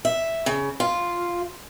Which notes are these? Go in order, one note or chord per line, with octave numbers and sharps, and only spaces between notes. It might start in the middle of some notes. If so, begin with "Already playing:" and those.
E5
C#3
F4